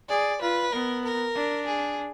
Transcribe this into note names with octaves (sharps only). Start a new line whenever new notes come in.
G#4 D5
F4 B4
B3 A#4
A#4
D4
G#4